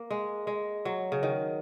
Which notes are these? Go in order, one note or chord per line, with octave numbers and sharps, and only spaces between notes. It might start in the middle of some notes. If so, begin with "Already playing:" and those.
Already playing: A#3
G#3
G#3
F#3
C#3
D#3